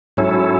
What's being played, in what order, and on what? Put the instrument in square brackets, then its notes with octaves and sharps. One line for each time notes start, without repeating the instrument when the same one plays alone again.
[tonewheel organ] G#2 F#3 C#4 E4 A4